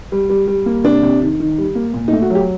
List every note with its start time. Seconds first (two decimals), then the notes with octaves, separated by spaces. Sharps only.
0.12 G3
0.29 G3
0.48 G3
0.66 A#3
0.84 C3 D4
1.03 C3
1.21 D#3
1.40 D#3
1.58 G3
1.75 A#3
1.94 A#2
2.08 D#4
2.13 A3
2.22 F#4
2.30 F#3 G4